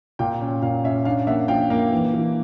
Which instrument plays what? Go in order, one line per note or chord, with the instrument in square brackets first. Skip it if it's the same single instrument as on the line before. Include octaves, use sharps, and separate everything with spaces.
[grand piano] A#2 F5 G5
C#4
A#2 F5
C#4 E5
D4 F5
A#3 E5 F#5
F3 F5 G5
A#3
E3
E3